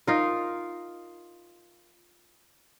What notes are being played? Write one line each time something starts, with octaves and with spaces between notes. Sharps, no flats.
D#4 F4 A#4